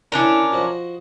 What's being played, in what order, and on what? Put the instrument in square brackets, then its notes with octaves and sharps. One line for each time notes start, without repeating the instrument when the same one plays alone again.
[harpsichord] D3 E4 [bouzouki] C#4 D4 A#4
[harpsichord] F3 F#4 D#5